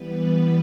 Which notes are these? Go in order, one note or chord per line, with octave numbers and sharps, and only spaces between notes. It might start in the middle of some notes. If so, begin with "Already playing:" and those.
Already playing: E3 G3 B3 B4